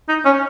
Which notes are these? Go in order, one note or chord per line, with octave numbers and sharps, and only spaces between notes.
D#4
C#4